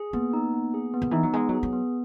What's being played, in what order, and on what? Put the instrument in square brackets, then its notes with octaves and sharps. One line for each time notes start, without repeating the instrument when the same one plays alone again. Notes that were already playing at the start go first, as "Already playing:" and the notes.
Already playing: [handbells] G#4
[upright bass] A#3 [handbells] B3
[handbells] D#4
B3
G#4
B3
[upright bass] D#3
[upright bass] E3 [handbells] D#4
[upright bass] F#3
[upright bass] G#3 [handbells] B3
[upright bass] F#3 [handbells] G#4
[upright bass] F#3
[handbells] B3